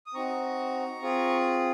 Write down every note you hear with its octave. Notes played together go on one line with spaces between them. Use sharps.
D#6
C4 D#4 F#4 A#5 C#6
C4 F4 G#4